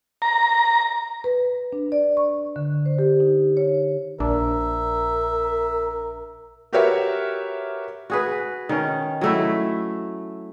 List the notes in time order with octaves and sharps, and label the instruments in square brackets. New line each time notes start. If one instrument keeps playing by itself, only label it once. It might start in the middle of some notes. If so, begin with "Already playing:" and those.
[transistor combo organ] A#5
[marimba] B4
D4
D5
C#6
D3
C5
G4
D#4
C#5
[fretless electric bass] A#1 [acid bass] D4 [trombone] A#4 [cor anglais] E5
[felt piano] F#4 G4 A#4 B4 C#5 E5
[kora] F#4 G#4 B4
D#3 C#4
F#3 A3 E4